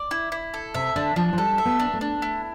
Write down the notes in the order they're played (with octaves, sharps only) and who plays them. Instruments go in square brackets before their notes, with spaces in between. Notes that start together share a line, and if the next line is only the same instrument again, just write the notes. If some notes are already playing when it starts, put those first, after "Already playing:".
Already playing: [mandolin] D5
E4
E4
A4
[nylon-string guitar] C3 [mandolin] E5
[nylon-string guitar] D3 [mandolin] D4
[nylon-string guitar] F3 [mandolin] D4
[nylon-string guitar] F3
[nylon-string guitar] G3 [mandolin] A4
[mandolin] E5
[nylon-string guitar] B3
[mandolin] D4
[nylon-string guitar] A3
[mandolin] D4
E4